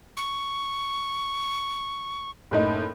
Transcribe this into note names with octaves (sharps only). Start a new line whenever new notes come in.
C#6
F#1 A2 D#4